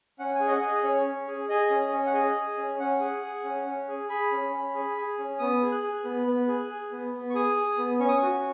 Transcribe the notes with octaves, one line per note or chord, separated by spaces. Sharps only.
C#4 F#5
G#5
G#4
D#5
F#5
G#4
D#5
C#4 C#5
C#4
G#4
G#4 D#5
C#4
C#4
F#5
G#4 D#5
G#4
C#4
C#4 F#5
G#4
G#4
C#4
C#4
G#4
G#4 B5
C#4
C#4
G#4
G#4
C#4
B3 D#6
G#4
F#6
G#4
B3
B3
G#4
G#4
B3
B3
C#6
G#4 D#6
G#4
B3
C#4 C#6
D#6
C#6
F#4